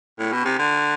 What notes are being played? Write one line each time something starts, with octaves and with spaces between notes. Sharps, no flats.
A2
B2
C3
D3